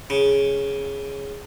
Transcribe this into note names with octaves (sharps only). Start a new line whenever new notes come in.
C#3